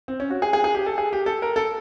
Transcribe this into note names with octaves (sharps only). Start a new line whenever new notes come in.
C4
C#4
F#4
G#4
G#4
G#4
G4
A4
G#4
G4
A4
A#4
A4